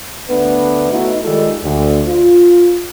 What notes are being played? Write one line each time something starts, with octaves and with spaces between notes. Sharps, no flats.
D2 A3 B3 D4 B4
A3 B3 D#4 E4 F#4 A4
D#3 G3 G#3 D#4 F4 A4
D2
F4